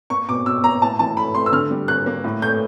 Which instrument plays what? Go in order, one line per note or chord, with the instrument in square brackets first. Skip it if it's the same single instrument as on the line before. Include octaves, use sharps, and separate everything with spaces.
[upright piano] A#3 C#6
B2 D6
B2 E6
A#3 A#5
A2 A5
E3 A5
A3 B5
A3 C6
E6
D3 F6
G3
A#3 F#6
A#3
A2
A3 G6